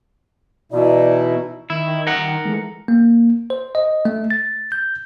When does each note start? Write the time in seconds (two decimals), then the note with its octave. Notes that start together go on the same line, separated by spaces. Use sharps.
0.72 B2 E3 D#4 E4 D5
1.70 D#3 E4
2.07 A#4 F#5
2.45 E3 G#3 A3
2.88 A#3
3.50 C5
3.75 D#5
4.05 A3
4.31 A6
4.72 G6